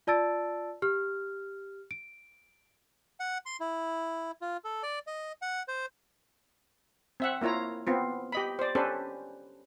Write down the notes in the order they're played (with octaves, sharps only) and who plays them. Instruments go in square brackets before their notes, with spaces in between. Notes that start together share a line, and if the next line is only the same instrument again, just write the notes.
[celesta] F4 D5 A5 E6 A6 D7
G4 F6
D7
[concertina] F#5
C6
E4
F4
A4
D5
D#5
F#5
C5
[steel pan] C4 E5 F#5
A#3 E4 F4 C#5 A#5
B3 C4 F4
G4 D#5 B5
C5 D5
C#4 D4 G4 A4 B4 C5